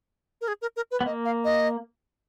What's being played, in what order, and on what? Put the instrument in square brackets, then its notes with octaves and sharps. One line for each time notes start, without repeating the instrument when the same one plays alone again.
[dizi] A#4
G#4
A#4
A#4
B4
[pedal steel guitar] B3
[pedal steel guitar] A#3 [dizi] D#5
[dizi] F5
D#5